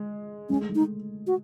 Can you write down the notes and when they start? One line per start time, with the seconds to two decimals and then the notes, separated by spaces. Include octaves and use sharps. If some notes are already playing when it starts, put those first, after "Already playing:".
Already playing: G#3
0.49 G#3 C#4
0.59 A3
0.70 G#3
0.75 D#4
1.27 F#4